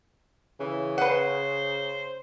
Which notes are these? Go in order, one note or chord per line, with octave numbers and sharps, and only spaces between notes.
C#3 E3
B4 C5 F#5